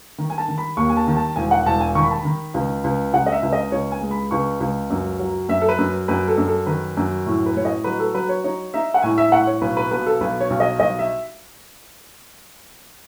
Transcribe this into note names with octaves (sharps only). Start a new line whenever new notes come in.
D#3
G#5
A5
D#3
B5
D#2 C#6
G#5
A5
D#3
A5
E1 G#5
F#5
E1 A5
G#5
D#3 C#6
B5
A5
B5
D#3
C#2
C#2
C#2 F#5
D#5
E5
C#2
D#5
C#2 C#5
G#5
G#3
B5
C#2 C#6
C#2
F#2
F#3
F#2 E5
A4
B4
F#2
F#2 B4
A4
F#2
A4
D#3 B4
F#2
A2
B4
A2 C#5
D#5
F#3 B4
A4
F#3 B4
C#5
D#4 C#5
D#4 E5
F#5
A2 G#5
E5
A2 F#5
C#5
B1 B4
B4
B2 B4
A4
B1 B4
C#5
B1
D#5
B1 D#5
E5